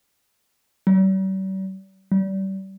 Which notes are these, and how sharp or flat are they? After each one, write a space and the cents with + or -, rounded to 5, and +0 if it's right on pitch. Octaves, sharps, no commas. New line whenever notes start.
G3 -45
G3 -30